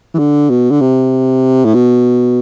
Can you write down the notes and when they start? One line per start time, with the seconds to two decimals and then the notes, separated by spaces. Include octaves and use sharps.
0.14 E3
0.18 D3
0.50 B2
0.71 D3
0.81 C3
1.65 A2
1.74 B2